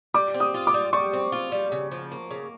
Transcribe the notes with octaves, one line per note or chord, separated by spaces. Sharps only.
G3 D6
C4
D#6
F4
D6
G3
G3 C#6
C4
F4
G3
C#3
F3
A#3
C#3